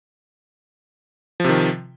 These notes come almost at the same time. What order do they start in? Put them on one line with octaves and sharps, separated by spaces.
F3 C3 D#3